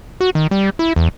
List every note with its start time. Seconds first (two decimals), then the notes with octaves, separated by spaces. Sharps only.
0.21 F#4
0.35 D#3
0.51 G3
0.79 E4
0.96 E2